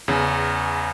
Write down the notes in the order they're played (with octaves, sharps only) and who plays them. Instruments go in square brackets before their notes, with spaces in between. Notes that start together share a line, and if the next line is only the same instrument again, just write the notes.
[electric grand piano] E2 C#3